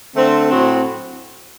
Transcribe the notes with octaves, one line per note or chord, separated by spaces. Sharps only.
D3 A3 C4
A2 F#3 C4